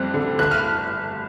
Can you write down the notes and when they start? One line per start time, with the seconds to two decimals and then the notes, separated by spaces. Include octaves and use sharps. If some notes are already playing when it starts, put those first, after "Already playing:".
Already playing: F2 G3 C4 F#6
0.14 D3
0.39 G1 F#6
0.51 F6